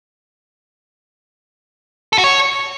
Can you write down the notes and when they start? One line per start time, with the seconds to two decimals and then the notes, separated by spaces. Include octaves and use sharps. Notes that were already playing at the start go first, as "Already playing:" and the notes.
2.13 A4
2.18 F#4
2.24 C#5